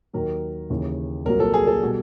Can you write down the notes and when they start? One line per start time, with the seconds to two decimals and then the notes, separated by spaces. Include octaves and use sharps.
0.13 D#2 D#3 F#3 A#4
0.70 D#2 C#3 E3
1.25 C2 A#2 F#3 A#4
1.40 A4
1.54 G#4
1.67 A4
1.83 B2 G3